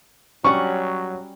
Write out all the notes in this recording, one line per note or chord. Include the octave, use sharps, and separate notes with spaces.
F#3 G3 C#4 F#5 C#6